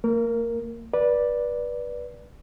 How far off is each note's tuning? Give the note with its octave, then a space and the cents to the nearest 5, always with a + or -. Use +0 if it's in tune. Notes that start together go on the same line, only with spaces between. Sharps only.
A#3 -40 A#4 +0
B4 -20 D5 +0